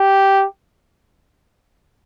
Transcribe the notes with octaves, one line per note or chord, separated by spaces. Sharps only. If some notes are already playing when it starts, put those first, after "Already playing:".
Already playing: G4